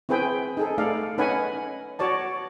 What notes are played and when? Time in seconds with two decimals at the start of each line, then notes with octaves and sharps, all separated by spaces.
0.09 C4 E4 G#4 B4 G5
0.57 D#4 G#4 A4
0.78 A3 D#4 A4 D5 F5
1.18 C#4 D#4 B4 D#5 F#5 G#5
1.99 F#4 C#5 D5 A5